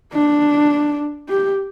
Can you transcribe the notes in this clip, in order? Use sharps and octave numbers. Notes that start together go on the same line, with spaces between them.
D4
G4